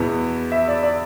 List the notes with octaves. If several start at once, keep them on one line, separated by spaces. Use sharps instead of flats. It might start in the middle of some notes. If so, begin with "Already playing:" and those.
Already playing: E2 B2 B3
E5
D5
D5